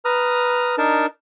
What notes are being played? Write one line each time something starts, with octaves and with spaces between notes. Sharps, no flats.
B4 A#5 D#6 F6
D4 D#4 A#4 A5